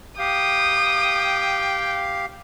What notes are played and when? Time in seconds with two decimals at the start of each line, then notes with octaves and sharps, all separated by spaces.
0.19 G4 F5 G5 D#6